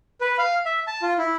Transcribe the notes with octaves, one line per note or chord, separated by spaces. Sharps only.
B4
F5
E5
A5
F4
E4